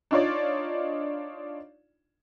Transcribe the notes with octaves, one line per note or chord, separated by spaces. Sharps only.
D4 D#4 F4 C#5 D5